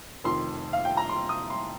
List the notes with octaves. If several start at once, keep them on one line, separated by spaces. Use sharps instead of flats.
F1 F2 D#3 C6
F5
G5
A#5
C6
D#6
C6